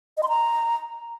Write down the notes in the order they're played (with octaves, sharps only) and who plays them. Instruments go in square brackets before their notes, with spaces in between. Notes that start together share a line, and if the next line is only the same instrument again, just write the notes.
[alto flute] D#5
C6
A#5